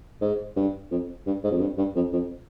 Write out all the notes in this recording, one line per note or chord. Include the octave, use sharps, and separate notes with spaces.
G#2
G2
F2
G2
G#2
F2
G2
G2
F2
F2